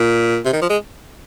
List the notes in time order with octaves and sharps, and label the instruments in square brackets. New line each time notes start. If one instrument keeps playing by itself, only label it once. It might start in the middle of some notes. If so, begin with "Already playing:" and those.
Already playing: [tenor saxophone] A#2
C3
D#3
F3
G#3